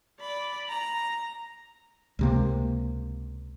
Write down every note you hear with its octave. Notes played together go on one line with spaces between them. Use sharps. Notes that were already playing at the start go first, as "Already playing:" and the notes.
D5 B5
A#5
C#2 C3 A#3